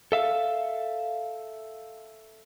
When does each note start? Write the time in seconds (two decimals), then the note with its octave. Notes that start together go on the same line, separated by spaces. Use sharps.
0.12 A4 E5 F5